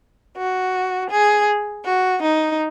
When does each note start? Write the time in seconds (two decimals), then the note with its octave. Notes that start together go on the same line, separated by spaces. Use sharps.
0.36 F#4
1.10 G#4
1.84 F#4
2.22 D#4